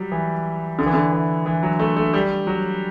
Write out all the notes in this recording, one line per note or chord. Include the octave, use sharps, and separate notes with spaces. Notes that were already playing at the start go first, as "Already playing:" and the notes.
Already playing: F#3 G3
E3
D3
E3
D3
E3
E3
F#3
A3
A3
G3
F#3